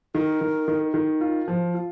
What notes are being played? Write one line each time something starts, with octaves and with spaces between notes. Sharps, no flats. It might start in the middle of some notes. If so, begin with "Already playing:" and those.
D#3 A#4
D#3
D#3
D#3
F4
F3
F4